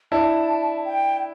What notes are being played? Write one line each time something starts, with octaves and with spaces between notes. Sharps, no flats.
D4 E4 A5
G5